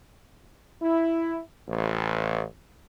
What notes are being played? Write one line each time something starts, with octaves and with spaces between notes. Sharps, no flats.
E4
A1